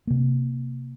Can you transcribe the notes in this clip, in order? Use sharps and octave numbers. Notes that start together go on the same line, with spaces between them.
C3 A#3